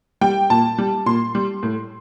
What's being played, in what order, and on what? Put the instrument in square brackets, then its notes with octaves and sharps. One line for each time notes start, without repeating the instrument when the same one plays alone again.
[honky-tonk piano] G3 G5
A#2 A5
G3
A#2 C6
G3
A2